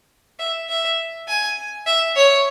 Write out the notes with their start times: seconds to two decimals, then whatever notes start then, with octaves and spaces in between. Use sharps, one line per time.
0.39 E5
0.69 E5
1.28 G#5
1.87 E5
2.16 C#5